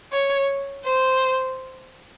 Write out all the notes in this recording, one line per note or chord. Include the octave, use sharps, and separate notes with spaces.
C#5
C5